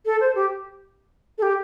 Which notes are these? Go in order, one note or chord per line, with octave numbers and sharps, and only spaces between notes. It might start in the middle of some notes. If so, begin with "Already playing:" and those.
A4
C5
G4
A4
G4